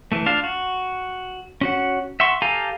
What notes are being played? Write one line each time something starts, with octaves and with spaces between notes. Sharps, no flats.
E3 A3
D4 F4 F5 A5
F#4
C#4 F#4 F#5
E5 F#5 C6 C#6
G4 A4 F5 G#5 A#5